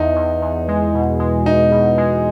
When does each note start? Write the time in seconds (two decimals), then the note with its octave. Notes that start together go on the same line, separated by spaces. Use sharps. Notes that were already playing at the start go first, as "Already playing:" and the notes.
Already playing: E2 D#4
0.16 E2
0.42 E2
0.68 G#3
0.94 B2
1.20 G#3
1.46 E2 D#4
1.72 B2
1.98 G#3